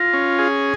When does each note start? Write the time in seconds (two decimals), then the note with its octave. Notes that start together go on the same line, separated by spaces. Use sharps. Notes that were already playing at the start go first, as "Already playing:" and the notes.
Already playing: F4 A#6
0.14 C#4
0.39 G#4